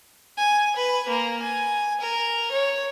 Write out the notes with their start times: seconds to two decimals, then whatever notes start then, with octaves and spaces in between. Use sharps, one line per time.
0.38 G#5
0.76 B4
1.09 A#3
1.42 G#5
2.01 A#4
2.51 C#5